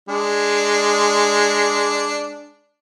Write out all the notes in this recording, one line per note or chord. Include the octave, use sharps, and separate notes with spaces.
G#3 D4